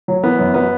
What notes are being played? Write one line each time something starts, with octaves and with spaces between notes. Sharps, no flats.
F#3
E3 B3
F#2
F#3 B3